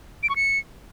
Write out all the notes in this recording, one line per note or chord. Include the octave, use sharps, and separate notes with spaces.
D7
C#6
C#7